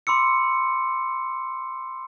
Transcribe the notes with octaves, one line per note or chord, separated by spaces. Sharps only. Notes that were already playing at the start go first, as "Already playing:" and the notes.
B5 C6 D6 E6 C#7